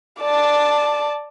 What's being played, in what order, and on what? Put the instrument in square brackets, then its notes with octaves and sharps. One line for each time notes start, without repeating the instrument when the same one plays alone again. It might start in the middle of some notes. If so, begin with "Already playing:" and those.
[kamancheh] D5 A5